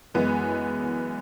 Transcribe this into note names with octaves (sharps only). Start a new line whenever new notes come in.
F#2 E3 G#3 B3